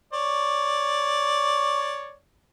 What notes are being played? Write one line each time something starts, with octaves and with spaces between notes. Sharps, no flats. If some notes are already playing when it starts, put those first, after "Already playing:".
C#5 D5